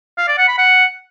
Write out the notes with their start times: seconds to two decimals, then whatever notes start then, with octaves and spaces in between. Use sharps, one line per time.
0.18 F5
0.28 D5
0.38 F#5
0.48 B5
0.58 F#5